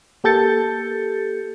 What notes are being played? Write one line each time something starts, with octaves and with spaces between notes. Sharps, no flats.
A#3 G4 A4 G6 A6 C#7